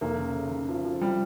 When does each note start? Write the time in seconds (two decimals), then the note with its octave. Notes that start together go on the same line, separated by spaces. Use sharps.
0.01 F1 A#3
0.18 C#3
0.34 C#3
0.51 C#3
0.68 F3
0.85 F3
1.01 F3 G3